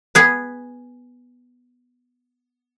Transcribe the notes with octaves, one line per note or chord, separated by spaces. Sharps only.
B3 G#4 B4